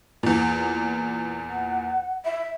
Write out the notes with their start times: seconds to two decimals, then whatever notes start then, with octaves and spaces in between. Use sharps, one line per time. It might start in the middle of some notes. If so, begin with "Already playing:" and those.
0.23 E2 A#2
1.50 F#5
2.24 E5